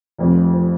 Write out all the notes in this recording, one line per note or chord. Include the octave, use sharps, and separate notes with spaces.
F1 F2 F3
F3